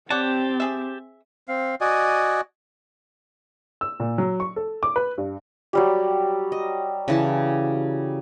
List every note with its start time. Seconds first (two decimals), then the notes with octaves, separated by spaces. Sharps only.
0.10 C4 G4 C#5 D5 F#5 A5
0.60 G#4 E5
1.48 C4 F5
1.81 F#4 D5 D#5 G#5
3.81 E6
4.00 A#2
4.18 F#3
4.40 C#6
4.56 A4
4.83 D6
4.96 B4
5.18 G2
5.73 F#3 G3 G4
6.52 D#5
7.08 C#3 E3 A5